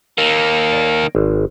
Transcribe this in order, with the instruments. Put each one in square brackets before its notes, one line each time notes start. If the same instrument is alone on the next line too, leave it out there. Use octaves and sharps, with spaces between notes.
[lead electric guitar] D#3 A#3
[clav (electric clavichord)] C#5 D5
G#1